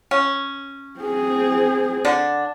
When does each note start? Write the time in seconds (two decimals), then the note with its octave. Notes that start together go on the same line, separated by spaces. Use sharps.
0.11 C#4
1.00 C4 G#4
2.05 D3 D4